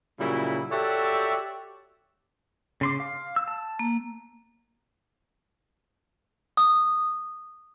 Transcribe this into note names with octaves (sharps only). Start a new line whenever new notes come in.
A#2 C#3 F#3 G3 E4
F#4 G4 A4 C#5 D5 E5
C#3 C6 D6
F5
E6
A5
A#3
D#6